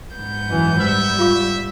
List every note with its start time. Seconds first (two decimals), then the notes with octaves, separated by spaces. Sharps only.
0.14 G#2 B3 G6
0.47 F#2 E3
0.80 G3 C5 E5
1.19 F4 F5 C#6